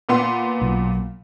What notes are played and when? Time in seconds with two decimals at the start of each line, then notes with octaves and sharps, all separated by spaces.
0.09 A#2 B3 C6
0.61 B1